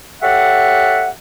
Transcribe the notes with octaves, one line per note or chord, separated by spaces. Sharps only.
G4 A4 C#5 E5 F#5